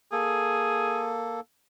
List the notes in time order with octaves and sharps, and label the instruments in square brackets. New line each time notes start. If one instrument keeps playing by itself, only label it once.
[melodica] A#3 A4 [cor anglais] G#4